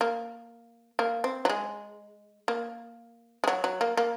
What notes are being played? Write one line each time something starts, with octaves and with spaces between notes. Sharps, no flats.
A#3
A#3
C4
F#3
G#3
A#3
G#3
F#3
F#3
A#3
A#3